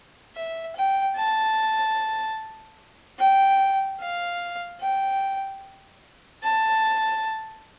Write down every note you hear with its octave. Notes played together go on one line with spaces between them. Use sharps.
E5
G5
A5
G5
F5
G5
A5